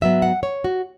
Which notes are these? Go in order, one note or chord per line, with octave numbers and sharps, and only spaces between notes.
G#2 F#3 B3 E5
F#5
C#5
F#4